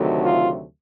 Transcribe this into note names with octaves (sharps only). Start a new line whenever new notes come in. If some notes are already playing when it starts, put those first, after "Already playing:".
Already playing: D2 C3 D#3 F#3 A3
F4